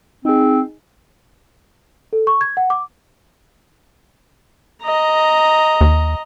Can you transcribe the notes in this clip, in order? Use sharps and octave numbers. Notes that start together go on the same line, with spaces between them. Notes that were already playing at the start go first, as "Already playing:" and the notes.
C4 D#4 G#4
A4
C#6
G#6
F#5
D6
D#5 A#5
D#2